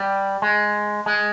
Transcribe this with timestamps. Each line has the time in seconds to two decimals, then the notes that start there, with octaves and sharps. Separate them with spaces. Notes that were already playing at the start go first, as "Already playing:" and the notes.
Already playing: G3
0.42 G#3
1.06 G#3